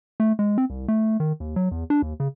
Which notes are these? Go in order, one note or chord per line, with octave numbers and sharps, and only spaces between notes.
A3
G#3
C4
C2
A3
D#3
D#2
F#3
E2
D4
D#2
C#3